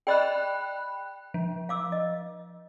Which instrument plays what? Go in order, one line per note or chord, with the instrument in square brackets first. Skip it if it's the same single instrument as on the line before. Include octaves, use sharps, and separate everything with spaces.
[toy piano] G#4 D5 D#5 [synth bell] G5 B5 F#6
[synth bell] F3
[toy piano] F5 D6 E6
D#5